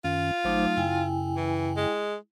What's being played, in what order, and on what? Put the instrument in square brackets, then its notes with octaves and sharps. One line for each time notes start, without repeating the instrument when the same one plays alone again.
[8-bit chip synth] F#2 D#3 C#4 [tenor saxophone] F4
[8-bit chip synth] G#1 C5 D6 [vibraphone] F#3 A3 D#4
[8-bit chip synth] F#2 C#3 [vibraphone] E4 G5 G#5
[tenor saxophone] E3
G#3